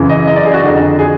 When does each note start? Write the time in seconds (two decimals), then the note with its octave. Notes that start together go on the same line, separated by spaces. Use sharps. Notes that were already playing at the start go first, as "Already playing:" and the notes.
Already playing: F#2 C#3 E3
0.09 D#5
0.27 D#5
0.36 D5
0.45 G#4
0.54 F#4
0.63 F2 D3
0.99 G#4